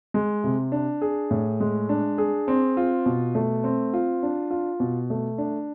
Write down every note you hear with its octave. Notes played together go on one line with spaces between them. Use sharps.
G#3
C3
D4
G#4
A2
G#3
D4
G#4
C4
F4
B2
A3
C4
F4
D4
F4
B2
A3
D4